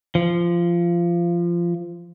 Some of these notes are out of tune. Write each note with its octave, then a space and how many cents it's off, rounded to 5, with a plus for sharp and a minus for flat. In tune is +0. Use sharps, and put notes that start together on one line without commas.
F3 -20